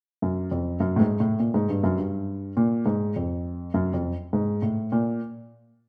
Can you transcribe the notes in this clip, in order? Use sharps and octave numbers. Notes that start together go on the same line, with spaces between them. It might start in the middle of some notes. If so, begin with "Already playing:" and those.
F#2
F2
F#2
A2
G#2
A2
A#2
G#2
G2
F#2
G2
A#2
G#2
F2
F#2
F2
G#2
A2
A#2